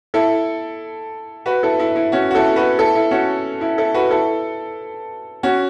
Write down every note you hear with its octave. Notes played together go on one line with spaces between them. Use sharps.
E4 A4
F#4 B4
E4 A4
E4
E4
C#4 F#4
F#4
E4 A4
F#4 B4
E4 A4
E4
C#4 F#4
E4
E4 A4
F#4 B4
E4 A4
C#4 F#4